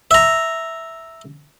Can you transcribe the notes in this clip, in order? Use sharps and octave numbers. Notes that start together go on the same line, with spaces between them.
E5 A#5